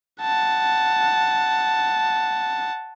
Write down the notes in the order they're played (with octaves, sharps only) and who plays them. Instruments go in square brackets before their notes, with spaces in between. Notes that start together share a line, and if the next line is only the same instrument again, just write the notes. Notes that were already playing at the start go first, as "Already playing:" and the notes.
[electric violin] F#5 A5